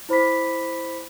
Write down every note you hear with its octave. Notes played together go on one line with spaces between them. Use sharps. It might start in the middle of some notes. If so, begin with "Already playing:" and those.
E4 C5 B5 D6 B6